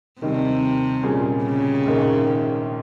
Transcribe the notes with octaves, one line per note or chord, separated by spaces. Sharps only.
D#2 C3 D#3 G3 C4
A#2 G3 C#4 G#4
C#3
A#1 G#2 D#3 A#3